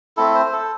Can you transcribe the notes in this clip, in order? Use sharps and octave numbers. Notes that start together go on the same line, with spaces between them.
A3 C4 E4 A4
C5
A4